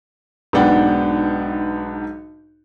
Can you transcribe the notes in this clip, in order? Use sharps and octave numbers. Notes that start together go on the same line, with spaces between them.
B1 G#2 B3 D4 F#5 G5